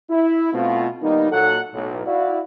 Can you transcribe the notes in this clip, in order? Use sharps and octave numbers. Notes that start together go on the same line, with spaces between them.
E4
B2 A3 C4 F4
D#3 G3 A#3 B3 D#4
A#2 F#3 A4 F#5
B1 A2
E4 F#4 D5 F5